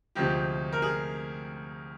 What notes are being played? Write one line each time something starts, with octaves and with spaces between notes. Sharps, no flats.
D2 C3 F3 G#3 G4
A#4
G#4